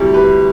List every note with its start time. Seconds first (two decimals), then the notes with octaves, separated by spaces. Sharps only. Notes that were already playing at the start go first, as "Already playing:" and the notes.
Already playing: D2 C3 G3 E4 G4
0.14 G4 B4